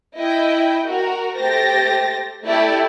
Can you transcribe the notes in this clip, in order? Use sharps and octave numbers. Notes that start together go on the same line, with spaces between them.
E4 D#5 G5
F#4 A#4
A3 G4 C5 A6 A#6
A3 E4 G4 D5 A5